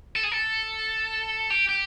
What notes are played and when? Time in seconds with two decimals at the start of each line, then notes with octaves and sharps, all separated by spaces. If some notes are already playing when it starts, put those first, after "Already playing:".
0.16 A4
0.24 G#4
0.32 A4
1.50 G4
1.69 G4